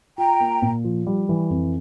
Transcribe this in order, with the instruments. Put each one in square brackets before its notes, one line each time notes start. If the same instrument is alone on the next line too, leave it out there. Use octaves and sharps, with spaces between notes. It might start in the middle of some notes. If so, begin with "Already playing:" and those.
[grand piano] F4 [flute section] G5 A#5
[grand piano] A#3
A#2
F3
G3
E3
F2